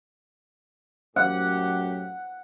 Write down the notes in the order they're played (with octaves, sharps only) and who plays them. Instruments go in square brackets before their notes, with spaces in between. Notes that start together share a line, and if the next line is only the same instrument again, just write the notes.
[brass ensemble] F#2 A2 G4 [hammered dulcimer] F#5